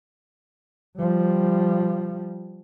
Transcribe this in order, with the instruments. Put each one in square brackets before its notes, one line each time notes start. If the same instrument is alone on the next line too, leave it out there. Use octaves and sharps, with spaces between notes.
[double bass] F3 G3